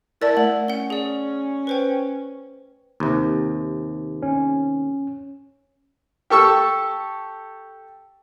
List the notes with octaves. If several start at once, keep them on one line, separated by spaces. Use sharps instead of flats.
E4 A#4 D5 A5 A6
A3 F#7
C#4 F#5 G7
G#4 D5
B4 C5 G5
D#2 C3
C#4
G4 A4 C#6 E6